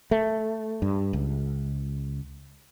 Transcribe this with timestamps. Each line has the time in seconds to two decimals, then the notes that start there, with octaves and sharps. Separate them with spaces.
0.11 A3
0.82 G2
1.13 C#2